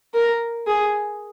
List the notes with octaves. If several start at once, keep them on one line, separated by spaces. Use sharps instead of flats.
A#4
G#4